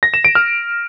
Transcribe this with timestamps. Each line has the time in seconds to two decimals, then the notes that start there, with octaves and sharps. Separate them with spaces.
0.03 A#6
0.14 E7
0.25 D7
0.35 F6